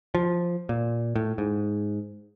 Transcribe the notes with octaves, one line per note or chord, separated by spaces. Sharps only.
F3
A#2
A2
G#2